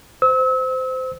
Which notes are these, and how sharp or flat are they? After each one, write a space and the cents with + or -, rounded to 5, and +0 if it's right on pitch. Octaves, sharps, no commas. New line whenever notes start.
C5 -20 E6 -35